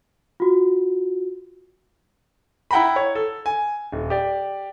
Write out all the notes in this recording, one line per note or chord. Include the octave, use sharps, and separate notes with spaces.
F4 F#4
E4 F#5 G5 A#5 B5
C#5
A4
G#5
D#1
G4 D5